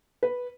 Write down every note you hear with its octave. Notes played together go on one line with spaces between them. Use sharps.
B4